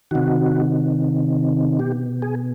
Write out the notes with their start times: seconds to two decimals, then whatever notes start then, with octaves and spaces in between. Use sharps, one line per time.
0.11 C3 D#3 F#4
1.79 B2 G4
2.22 G#4